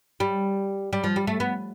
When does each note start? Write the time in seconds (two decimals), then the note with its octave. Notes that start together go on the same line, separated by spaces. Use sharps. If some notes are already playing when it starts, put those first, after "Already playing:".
0.20 G3
0.93 G3
1.04 F3
1.16 G3
1.27 A3
1.40 B3